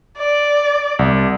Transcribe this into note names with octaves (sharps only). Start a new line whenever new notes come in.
D5
C2